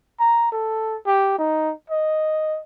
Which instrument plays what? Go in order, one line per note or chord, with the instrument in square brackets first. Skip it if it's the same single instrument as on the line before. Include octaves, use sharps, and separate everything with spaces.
[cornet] A#5
A4
G4
D#4
D#5